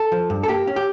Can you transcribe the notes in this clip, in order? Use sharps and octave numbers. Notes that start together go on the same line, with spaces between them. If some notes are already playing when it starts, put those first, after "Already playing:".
Already playing: A4
F3
G2
A4
A#3 G4
C#4
G4